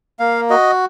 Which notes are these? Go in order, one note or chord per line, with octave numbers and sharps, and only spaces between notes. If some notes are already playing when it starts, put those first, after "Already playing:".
A#3 F5
F#4 D#5